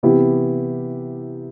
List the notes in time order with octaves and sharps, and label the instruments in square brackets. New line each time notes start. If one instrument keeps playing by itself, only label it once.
[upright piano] C3 E3 B3 E4 G4